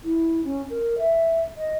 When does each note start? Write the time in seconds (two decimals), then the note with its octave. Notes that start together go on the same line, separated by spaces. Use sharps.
0.04 E4
0.44 C#4
0.70 A#4
0.98 E5
1.57 D#5